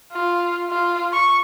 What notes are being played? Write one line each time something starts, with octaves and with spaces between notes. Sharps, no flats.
F4
F4
C#6